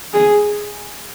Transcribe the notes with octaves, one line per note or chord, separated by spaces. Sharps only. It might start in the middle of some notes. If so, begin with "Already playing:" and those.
G#4